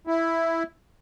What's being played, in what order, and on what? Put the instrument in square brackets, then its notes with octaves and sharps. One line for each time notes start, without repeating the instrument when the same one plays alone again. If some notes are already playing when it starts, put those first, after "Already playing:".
[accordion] E4